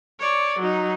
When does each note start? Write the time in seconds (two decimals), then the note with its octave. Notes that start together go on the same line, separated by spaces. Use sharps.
0.20 C#5 D5
0.59 F#3 D#4